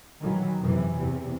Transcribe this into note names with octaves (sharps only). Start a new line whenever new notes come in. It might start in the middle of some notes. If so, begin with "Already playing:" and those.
D#3 E3 F#3
F#2 C3 E3
E2 C3